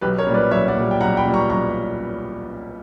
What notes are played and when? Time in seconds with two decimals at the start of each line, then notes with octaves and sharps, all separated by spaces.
0.01 B1 G4 B4
0.18 A#4 C#5
0.27 A#2 G3
0.34 B4 D5
0.51 B1 C#5 E5
0.68 D5 F#5
0.76 A#2 G3
0.91 G5
1.01 B1 F#5 A#5
1.17 G5 B5
1.25 A#2 G3
1.34 A#5 C#6
1.50 B1 A#5 C#6